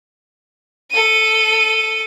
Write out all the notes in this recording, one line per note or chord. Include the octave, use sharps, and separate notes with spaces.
A4 D#7